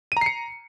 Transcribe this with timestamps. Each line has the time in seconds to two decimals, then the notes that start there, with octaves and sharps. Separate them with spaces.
0.12 D#7
0.17 A#5
0.21 C7
0.26 C#7